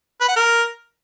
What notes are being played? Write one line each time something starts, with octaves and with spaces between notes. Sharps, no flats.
B4
F#5
A#4